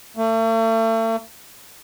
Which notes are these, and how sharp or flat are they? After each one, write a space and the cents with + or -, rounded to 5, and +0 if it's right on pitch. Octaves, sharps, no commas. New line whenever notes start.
A3 +40